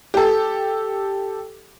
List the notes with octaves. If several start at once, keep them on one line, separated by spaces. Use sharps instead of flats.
G4 A4